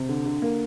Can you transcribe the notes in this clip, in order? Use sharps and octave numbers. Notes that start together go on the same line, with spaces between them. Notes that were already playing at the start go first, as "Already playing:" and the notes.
Already playing: C3
D3
D3
A#3